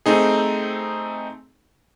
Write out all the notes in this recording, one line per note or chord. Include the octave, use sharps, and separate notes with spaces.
A3 C4 D#4 G#4